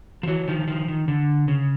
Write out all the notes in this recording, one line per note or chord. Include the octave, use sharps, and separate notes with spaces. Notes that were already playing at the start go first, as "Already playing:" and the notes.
F3
E3 F#3
D#3 F3
D#3 F3
D#3
D3
C#3